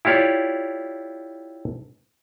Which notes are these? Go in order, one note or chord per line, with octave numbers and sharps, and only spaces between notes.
E4 F4 G4 C#5 D5